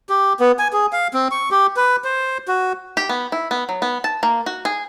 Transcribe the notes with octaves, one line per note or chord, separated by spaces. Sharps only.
G4
B3
G#5
G#4
F5
C4
C#6
G4
B4
C5
F#4
G4
B3
E4
B3
F#3
B3
A5
A#3
F#4
G#4